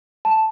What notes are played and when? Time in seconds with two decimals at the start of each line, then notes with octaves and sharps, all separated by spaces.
0.25 A5